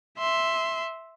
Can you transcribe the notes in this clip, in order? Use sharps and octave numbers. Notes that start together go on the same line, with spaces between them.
E5 C6